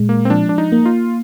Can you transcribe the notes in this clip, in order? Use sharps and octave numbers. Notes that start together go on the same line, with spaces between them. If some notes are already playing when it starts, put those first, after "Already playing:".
Already playing: A#2 G#3
A#3
C4
F3 D4
D4
D#4
A#3
F4